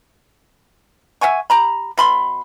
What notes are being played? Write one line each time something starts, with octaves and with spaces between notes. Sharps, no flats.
E5 F#5 G#5 C#6
G4 A#5 B5
B2 B5 C6